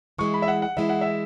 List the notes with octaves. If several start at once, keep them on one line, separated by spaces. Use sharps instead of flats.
E3 G#3 E4 C#6
B5
E5
F#5
F#5
E3 G#3 E4 E5
F#5
E5